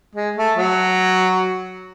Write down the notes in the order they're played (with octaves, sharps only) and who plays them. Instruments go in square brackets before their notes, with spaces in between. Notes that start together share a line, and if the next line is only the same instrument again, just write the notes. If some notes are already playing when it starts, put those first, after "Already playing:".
[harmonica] G#3
A3
F#3